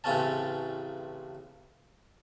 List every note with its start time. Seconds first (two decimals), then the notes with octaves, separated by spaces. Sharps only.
0.04 A1 A2 C#3 C4 C#4 A5